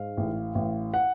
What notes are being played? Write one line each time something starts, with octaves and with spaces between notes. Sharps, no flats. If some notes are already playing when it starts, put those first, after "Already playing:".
Already playing: G#2 F5
A1
A1
F#5